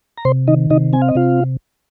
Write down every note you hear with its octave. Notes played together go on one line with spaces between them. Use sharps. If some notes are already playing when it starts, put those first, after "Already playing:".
A#5
C3 C5 C6
D#3 D#4 D#5
C3 D#4 D#5
C4 G#5
F5
D#5
C3 F4 F5